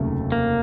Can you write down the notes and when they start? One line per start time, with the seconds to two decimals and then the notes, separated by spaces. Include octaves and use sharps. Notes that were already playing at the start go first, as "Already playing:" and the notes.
Already playing: F1 D#2 C#3 F#3 A3
0.32 A#3